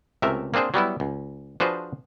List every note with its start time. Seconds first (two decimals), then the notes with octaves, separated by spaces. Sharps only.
0.22 C#2 C3 A3 A#4 E5
0.54 A#3 C4 D4 G#4 C5
0.74 F#3 G3 B3 E4
1.00 C#2
1.60 F3 D4 F#4 G#4 B4 C5